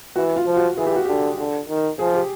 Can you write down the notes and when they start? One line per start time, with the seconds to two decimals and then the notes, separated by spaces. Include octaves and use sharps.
0.16 E3 F#4
0.36 F4
0.47 F3
0.57 F#4
0.77 E3 G#4
0.87 G4
0.96 F#4
1.05 D3 G4
1.38 D3
1.69 D#3
1.99 F3 G#4
2.14 G4